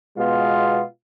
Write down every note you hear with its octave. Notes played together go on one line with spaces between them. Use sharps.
B2 G#3 B3 F4